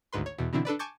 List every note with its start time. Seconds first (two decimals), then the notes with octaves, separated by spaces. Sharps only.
0.12 G#1 D2 G#2 B4 C6
0.26 C#5
0.38 E2 B2
0.53 B2 D3 E3 C4 D4 E4
0.65 D4 A4 B4 D5
0.79 G#5 A5 C#6 D6 G6 A6